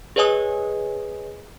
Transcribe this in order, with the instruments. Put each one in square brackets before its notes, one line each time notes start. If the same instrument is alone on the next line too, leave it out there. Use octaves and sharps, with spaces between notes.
[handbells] G#4 B4 C#5 D#5 G#5 D#6